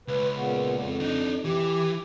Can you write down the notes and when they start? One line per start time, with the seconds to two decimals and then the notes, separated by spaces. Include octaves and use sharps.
0.08 C#2 B4
0.36 A#2 C#3 B3
0.78 F2
1.00 D4 D#4
1.45 E3 G4